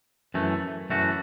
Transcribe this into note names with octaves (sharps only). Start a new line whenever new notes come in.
F#2 E3 A3
F#2 E3 A3 F#4